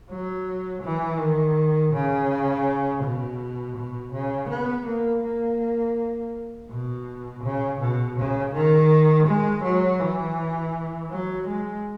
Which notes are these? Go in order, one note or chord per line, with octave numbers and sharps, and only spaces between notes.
F#3
E3
D#3
C#3
B2
B2
C#3
B3
A#3
A#3
B2
C#3
B2
C#3
D#3
G#3
F#3
E3
F#3
G#3